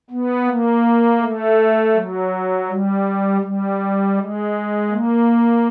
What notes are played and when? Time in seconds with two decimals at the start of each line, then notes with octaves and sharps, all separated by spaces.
0.11 B3
0.47 A#3
1.20 A3
1.94 F#3
2.68 G3
3.42 G3
4.16 G#3
4.90 A#3